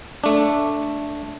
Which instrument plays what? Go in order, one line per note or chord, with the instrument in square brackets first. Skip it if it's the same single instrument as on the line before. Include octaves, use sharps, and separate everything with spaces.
[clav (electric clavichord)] A3 D4